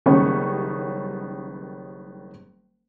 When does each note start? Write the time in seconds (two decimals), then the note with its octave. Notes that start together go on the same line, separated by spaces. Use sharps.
0.06 F#1 D#3 G3 B3 C#4 C#6